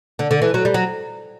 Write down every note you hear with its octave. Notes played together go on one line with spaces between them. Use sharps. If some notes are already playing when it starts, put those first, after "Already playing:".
D3
D3
E3
F#3
G3
F#3